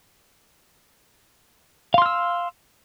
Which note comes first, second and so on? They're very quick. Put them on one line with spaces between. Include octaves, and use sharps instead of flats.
F5 C6 F6 E6